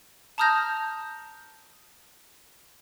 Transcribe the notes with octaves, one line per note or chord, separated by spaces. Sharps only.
A5 A#5 D#6 F6 G6 A#6